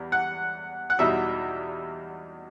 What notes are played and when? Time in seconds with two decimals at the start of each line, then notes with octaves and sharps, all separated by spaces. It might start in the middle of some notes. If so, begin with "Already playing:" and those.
Already playing: E2 G3
0.12 F#5
0.90 F#5
0.99 E2 B2 G3 D#4 E5